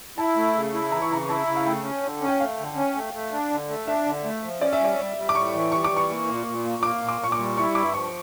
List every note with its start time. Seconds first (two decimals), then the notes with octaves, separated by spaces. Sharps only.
0.18 E4 A5
0.36 A3
0.55 C#3
0.74 E4
0.92 E3 A#5
1.02 C#6
1.10 C#3 A#5
1.28 E4 A5
1.47 C#3
1.56 F5
1.66 A3 G5
1.84 C#4
2.03 D3
2.21 C#4
2.28 G5
2.40 A3 F5
2.58 D3
2.76 C#4
2.95 A3
3.13 A3
3.32 D4
3.51 D3
3.69 A3
3.87 D4 E5
4.06 D3
4.24 A3
4.43 F3
4.61 C#4 D5
4.73 E5
4.80 G3 D5
4.98 G3
5.17 G3
5.29 D6
5.35 A2 C#6
5.54 E3
5.72 G3 C#6
5.84 D6
5.91 E3
5.97 C#6
6.10 A#3
6.27 A#2
6.47 A#2
6.65 A#3
6.83 A#3 D6
7.02 A#2
7.08 D6
7.21 A#2 C#6
7.32 D6
7.38 G3
7.57 E4 C#6
7.75 G2 D6
7.94 F3 C#6